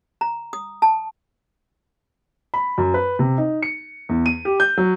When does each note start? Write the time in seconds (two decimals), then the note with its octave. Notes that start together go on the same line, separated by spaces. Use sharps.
0.21 A#5
0.53 D#6
0.82 A5
2.54 B5
2.78 F#2
2.94 B4
3.19 C3
3.38 D#4
3.62 C#7
4.09 E2
4.26 D#7
4.45 G4
4.60 G6
4.77 F#3